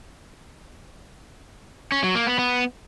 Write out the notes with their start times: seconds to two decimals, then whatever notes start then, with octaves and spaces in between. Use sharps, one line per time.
1.92 C#4
2.03 F#3
2.15 A#3
2.27 B3
2.39 B3